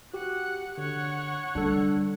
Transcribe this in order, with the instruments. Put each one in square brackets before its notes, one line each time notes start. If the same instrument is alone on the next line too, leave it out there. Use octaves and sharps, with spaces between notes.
[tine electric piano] F#4 G4 [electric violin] F#5
[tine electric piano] D3 [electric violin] C#5 F#5
[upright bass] D3 G3 [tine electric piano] D4 A4